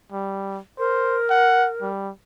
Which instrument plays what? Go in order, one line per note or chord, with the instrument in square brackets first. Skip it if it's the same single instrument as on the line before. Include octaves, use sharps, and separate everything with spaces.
[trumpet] G3
[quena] A#4 [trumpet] C5
[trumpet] F#5
G3